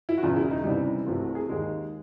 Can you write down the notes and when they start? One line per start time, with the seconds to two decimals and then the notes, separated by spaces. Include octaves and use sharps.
0.09 E4
0.18 F#4
0.22 E1 E2 C#3 F4
0.36 E4
0.51 D#4
0.64 C#2 C3 E3 G3
1.06 C2 C3 E3 A3 F4
1.20 F#4
1.35 G#4
1.49 D#2 D#3 G#3